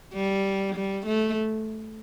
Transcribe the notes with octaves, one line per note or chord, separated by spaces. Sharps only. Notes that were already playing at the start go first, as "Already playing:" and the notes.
G3
G3
A3